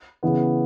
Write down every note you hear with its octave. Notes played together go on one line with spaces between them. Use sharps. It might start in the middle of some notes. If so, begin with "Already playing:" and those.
C#3 E3 B3